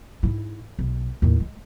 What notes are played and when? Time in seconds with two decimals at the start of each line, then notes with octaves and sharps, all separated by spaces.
0.23 G#2 E4
0.79 B1
1.22 D#2 A2
1.40 G#3